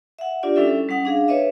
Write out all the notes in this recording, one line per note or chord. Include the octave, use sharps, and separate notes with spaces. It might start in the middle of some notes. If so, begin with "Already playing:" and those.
E5 F#5
D4 F4 G4 D5
G3 C#4 E4 A4 E5
G3 C#4 F#5 D#6
D4 G#4 F5
B4 C#5 D#5 E5